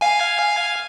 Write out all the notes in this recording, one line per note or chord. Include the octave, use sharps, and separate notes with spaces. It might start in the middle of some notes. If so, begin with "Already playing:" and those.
F5 G#5